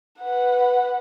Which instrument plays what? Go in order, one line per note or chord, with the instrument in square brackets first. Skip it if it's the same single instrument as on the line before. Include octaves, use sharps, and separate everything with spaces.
[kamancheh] B4 F#5